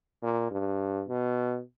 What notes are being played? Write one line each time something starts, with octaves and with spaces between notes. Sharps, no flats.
A#2
G2
B2